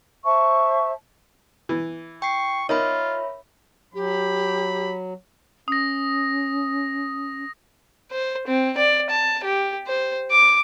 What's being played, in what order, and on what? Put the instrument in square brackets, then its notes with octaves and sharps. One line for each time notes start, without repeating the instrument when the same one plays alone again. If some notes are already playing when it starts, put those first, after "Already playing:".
[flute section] C5 E5 A5 C#6
[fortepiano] E3
[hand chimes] G5 C7 [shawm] C#6
[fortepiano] D#4 A#4 [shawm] F4 [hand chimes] C#5 E5 B5
[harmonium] F#3 [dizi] G4 [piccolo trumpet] B5
[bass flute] C#4 [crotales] D#6 A#6
[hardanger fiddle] C5
C4
D5
A5
G4
C5
D6